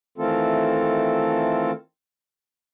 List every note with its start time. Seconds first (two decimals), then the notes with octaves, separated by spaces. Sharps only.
0.18 D#3 E3 A3 C4 F4 A4